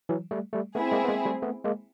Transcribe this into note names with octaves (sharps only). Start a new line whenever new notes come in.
E3 F#3
G3 A3
G3 A3
A3 B3 C4 E4 G#4
G#3 A#3
B3
G#3 A#3
G3 A3
A3 B3
G#3 A#3